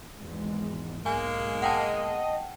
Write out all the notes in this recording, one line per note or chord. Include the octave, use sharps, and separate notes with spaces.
G#1 E2 G#3
B1 G#2 G#3 A#3 G#5
D#5 F#5 G5 A5